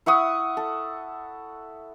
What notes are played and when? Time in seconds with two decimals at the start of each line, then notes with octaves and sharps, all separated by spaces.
0.06 E4 F#5 C#6 D#6
0.57 A4